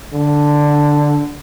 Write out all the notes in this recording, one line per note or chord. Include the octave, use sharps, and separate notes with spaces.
D3